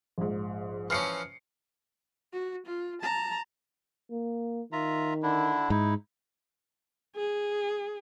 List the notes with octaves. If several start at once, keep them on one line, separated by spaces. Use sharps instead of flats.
A#1 G#2
E3 F3 C#4 F6 C7 C#7
F#4
F4
A5 A#5
A#3
D#3 F4 E5 A#5
D3 D4 E4
G#2 D#4 E4
G#4